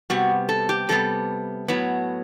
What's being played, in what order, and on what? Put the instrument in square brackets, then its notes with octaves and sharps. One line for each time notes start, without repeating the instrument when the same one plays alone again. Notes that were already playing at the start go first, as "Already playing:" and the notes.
[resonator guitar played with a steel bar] C3 G3 B3 F#4
A4
G4
C3 G3 B3 A4
A2 F#3 B3